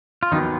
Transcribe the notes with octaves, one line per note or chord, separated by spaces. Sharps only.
F4
D#2 D#3 F#3 B3 D#4